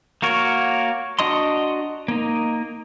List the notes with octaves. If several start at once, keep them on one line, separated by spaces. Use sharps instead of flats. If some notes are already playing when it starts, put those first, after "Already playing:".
A#3 F#4 A#4 C#5
D4 F#4 D#5 A#5 C6
A#3 D#4